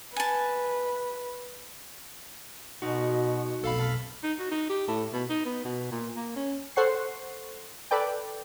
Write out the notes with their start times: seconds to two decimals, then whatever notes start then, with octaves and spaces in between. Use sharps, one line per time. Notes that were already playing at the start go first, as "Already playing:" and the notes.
0.16 B4 G#5 A5
2.82 B2 D#4 F#4
3.64 F1 B1 A4 F5 B5
4.24 D#4
4.39 F#4
4.51 D#4
4.69 G4
4.88 A2
5.13 B2
5.30 D#4
5.45 B3
5.65 B2
5.92 A#2
6.16 A#3
6.36 C#4
6.76 A4 C5 F#5 C#6 C7
7.91 A4 B4 D5 G5